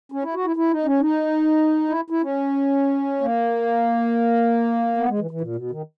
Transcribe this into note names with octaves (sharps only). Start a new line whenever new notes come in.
C#4
E4
F#4
E4
E4
D#4
C#4
D#4
E4
E4
C#4
A#3
B3
G#3
E3
E3
A#2
B2
D#3